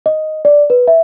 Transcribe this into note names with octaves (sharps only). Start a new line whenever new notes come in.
D#5
D5
B4
E5